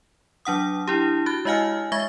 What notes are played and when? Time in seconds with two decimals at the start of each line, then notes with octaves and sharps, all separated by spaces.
0.45 F#3 D4 F#5 D#6
0.87 D4 E4 G4
1.26 F#4 F#6
1.45 G#3 E4 D#5 F5 G#5 F6
1.92 G#3 E5 C#6 G#6 A#6 G7